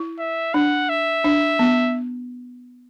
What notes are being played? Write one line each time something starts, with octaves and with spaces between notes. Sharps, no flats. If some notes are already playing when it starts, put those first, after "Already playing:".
Already playing: E4
E5
D4 F#5
E5
D4
B3